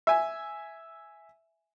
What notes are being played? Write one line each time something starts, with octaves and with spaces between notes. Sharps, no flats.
E5 G#5